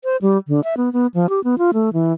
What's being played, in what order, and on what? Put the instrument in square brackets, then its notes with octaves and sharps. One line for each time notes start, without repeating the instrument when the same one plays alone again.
[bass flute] C5
G3
D3
E5
B3
B3
F3
G4
B3
F4
A3
E3